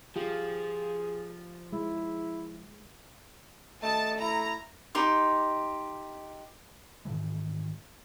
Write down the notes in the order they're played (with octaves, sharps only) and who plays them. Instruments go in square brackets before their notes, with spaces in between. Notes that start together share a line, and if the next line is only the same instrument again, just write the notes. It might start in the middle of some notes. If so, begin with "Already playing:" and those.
[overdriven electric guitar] F3 [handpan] F4 G4 [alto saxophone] G#4
[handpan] G#3 [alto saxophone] E4
[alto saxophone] A3 [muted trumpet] D#5 [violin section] A5
[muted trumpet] E4 [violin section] A#5
[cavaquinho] D#4 G4 C6 D6
[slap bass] G#2 D#3 E3 G#3